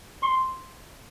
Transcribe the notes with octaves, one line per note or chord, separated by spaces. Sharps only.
C6